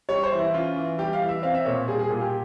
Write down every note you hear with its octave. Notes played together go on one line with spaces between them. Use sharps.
G3 C#5
C5
E3
E4
C#4 F4
E3
G3 G4
F5
E3
E5
C4 F5
E5
A#2 C#5
G3 G#4
G#4
A#2 F4
G4